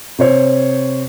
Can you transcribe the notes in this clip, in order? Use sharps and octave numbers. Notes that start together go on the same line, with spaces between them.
C3 C5 C#5